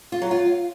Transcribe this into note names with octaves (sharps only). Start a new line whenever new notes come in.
F4
F#3
F4